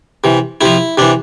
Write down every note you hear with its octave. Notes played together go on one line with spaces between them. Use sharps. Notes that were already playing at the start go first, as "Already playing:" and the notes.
C3 E3
C3 F3 E4
C3 E3 D4